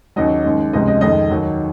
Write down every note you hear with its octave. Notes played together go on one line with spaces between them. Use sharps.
D#2 C#3 F#3 D#5
D#2 C#3 G#3
C#2 C3 F3 G#3 D#5
D#5
F2 D#3 G#3 D#5
D#2 D#3 F#3